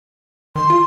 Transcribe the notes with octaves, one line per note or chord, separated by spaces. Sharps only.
D#3 C6
F4